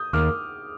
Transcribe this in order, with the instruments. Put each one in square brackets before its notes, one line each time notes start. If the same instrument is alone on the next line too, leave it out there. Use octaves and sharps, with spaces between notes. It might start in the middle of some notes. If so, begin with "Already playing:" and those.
Already playing: [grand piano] D#6 G6
[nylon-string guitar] D#2 [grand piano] D6 F6